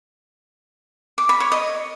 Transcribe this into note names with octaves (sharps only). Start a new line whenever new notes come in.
D6
B5
C#5
D#5